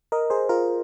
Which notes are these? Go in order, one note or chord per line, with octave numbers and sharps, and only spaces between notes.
A#4 D#5
G#4 C5
F4 A#4